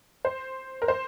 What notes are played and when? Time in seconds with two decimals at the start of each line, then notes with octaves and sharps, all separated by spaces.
0.25 C5
0.82 A#4
0.88 C5